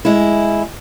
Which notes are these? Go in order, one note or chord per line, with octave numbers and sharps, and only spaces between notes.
G#3 E4